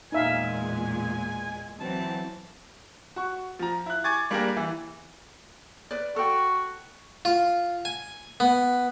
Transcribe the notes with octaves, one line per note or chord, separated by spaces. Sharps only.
E2 A#2 G#3 D#4 E5 F5 G#5
E3 F#3 C4 A5
F#4 C#6
F3 A#5
E4 F#6
G#5 C#6 D6 G#6 A6
G3 A#3 D4 G4 G#4 A#4
E3
B4 D5
F#4 A4 G5
F4
G#5
B3